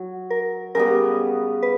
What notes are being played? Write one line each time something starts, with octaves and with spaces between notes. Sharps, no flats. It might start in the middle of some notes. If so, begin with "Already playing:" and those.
Already playing: F#3
A#4
C#3 G3 B3 A#4
B4